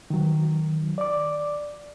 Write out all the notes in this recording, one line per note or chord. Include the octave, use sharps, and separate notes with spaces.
D#3 F#3
D5 D6